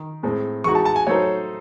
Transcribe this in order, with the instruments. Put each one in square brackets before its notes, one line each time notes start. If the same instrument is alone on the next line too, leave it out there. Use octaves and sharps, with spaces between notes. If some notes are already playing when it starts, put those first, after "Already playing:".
Already playing: [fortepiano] D#3
A2 G#3 C4
[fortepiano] E3 G#3 D#4 F#4 [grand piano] C#6
[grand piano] A5
A5
G#5
[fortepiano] F#3 A3 D#4 A4 C5 [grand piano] C#5